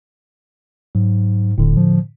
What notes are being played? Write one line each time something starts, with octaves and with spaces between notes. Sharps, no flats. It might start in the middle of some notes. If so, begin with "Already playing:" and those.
G#2 F#3
D#1 A2 D3
F3